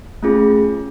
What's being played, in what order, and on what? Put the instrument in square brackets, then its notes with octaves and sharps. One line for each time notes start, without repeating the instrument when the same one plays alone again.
[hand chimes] A3 C#4 F4 G#4